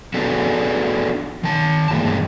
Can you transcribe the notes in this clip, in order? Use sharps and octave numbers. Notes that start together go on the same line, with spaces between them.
B3 D4 F#4 G#4 A4 B4
D#3 A5
G2 A#2 E3 G#3 A#3